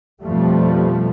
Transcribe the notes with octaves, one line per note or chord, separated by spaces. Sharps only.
F2 B2 F3 G3 A3